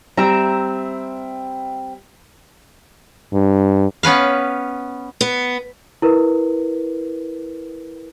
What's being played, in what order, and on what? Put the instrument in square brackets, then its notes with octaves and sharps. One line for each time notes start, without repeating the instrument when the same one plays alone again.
[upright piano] G3 [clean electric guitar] C4 [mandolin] E5 A#5
[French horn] G2
[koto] B3 C#4 B4 F5
[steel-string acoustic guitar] B3
[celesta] E4 A#4 B4